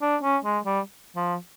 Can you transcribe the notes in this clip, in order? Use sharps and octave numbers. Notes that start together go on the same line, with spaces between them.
D4
C#4
G#3
G3
F3